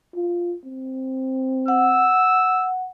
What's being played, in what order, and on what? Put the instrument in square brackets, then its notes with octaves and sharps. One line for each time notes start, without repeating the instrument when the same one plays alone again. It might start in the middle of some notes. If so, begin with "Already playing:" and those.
[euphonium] F4
C4
[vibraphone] F#5 [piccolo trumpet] E6